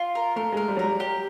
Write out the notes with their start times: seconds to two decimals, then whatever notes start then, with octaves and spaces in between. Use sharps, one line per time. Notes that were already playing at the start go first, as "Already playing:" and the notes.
Already playing: F4
0.15 A#4
0.36 A3 A#4
0.52 G#3 A#4
0.68 G3
0.77 F#3 A#4
0.84 G3
1.00 G4